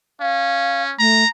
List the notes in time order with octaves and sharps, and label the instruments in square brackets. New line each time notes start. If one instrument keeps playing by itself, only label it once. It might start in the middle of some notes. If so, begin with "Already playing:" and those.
[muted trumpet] C#4 [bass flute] F5
[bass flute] A3 [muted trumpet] A#5